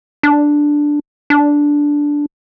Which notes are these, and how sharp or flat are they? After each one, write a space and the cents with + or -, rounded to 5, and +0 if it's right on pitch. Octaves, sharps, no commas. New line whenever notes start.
D4 +0
D4 -5